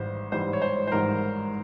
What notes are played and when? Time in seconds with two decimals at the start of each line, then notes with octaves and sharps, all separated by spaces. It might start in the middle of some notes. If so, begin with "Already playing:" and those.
Already playing: G#1 G#2 E3 G3 C5
0.32 G#1 G#2 E3 G3 C5
0.53 C#5
0.62 C5
0.87 C5
0.92 G#1 G#2 E3 G3 A#4